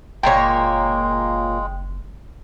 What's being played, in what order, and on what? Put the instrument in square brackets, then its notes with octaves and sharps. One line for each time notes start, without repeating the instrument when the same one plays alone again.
[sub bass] F#1 [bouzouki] A#2 A#3 C#5 [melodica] G#3 [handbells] G5